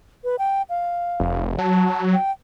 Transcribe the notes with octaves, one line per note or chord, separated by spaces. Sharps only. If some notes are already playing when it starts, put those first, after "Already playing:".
B4
G5
F5
F1
F#3 A5
G5